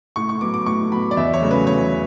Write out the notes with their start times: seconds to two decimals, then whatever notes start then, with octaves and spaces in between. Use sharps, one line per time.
0.16 A2 C#6
0.29 C#6
0.41 F#3 B3 D6
0.54 D6
0.66 A2 C#6
0.92 F#3 B3 B5
1.11 D5
1.17 E2 E5
1.34 C#5
1.42 C#3 F#3 A3
1.51 B4
1.67 E2 C#5